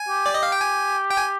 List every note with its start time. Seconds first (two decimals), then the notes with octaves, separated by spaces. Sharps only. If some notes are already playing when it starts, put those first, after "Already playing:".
Already playing: G#5
0.09 G4
0.26 D5
0.34 D#5
0.43 F5
0.52 G5
0.60 G#5
1.11 G5
1.17 G#5